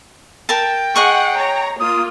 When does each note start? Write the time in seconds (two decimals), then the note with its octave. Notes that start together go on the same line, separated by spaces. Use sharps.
0.49 A#4 G5 A5
0.96 G#4 D#5 F#5 C#6
1.36 C#5 A#5
1.80 A#3 F4 D#6